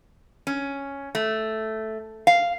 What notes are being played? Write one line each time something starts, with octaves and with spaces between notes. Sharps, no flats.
C#4
A3
F5